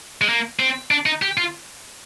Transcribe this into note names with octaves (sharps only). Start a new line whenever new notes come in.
G#3
A#3
C4
D4
D#4
G4
F4